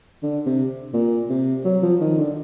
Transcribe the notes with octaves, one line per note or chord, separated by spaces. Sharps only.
D3
C3
A#2
C3
F#3
F3
D#3
D3